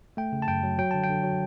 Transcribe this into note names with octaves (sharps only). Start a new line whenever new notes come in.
A3 G5
C#3
A5
F#2 G5
F#3
F#3 G5
D3 A5
G5
D3
F#3